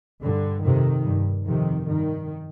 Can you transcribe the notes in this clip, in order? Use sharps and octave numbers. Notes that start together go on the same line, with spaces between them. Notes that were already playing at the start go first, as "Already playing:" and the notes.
G2 D3
F2 C3 D#3
G2
F2 C3 D#3
G2 D#3